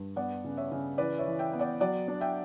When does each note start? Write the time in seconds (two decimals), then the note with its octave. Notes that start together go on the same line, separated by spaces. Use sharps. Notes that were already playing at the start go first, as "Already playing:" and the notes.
Already playing: G2
0.16 B3 D5 F#5
0.44 C#3
0.57 C#5 E5
0.72 C#3
0.98 E3 B4 D5
1.19 C#5 E5
1.26 E3
1.39 E5 G5
1.53 B3
1.59 D5 F#5
1.80 F#3 D5 F#5
2.08 D4
2.21 E5 G5